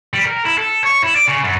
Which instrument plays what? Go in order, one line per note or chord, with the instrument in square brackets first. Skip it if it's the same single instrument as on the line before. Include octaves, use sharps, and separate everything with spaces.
[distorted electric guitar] G3
A#4
E4
A4
C#5
E4
D5
C#3
F#2